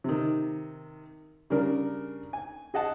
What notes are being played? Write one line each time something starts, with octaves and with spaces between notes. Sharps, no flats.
C3 D#3
C#3 G3 D4 A#4
G#5
G#4 D#5 F#5 A5